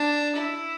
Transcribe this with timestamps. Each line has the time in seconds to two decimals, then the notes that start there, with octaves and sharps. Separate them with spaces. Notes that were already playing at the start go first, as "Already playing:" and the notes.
Already playing: D4
0.35 E4